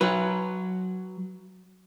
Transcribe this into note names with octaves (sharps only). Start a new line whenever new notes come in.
F#3 B4